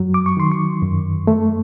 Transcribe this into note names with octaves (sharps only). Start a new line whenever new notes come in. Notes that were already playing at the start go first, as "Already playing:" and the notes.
Already playing: F#2 F#3
D6
C#6
D#3 C6
C#6
F#2
A3